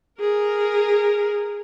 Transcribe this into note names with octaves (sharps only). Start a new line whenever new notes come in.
G#4 A#4